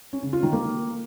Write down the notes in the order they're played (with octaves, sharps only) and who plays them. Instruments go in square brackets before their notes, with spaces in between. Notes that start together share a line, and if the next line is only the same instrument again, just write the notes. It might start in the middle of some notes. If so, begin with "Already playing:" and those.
[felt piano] C#4
C#3
F4
D#3
A#3